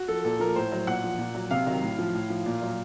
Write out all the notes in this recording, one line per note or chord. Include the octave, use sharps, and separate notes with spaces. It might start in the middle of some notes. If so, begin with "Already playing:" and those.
Already playing: F#4
F3 A4
A#2 A4
F3 A#4
A2 C5
F#3
A#2 F#5
F3
A#2
F#3
C3 F5
D#3 F#3
A2
F3
A2
F3
A#2
F#3